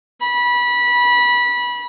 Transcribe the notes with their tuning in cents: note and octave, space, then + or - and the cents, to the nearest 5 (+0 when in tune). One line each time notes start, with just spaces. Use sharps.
B5 -20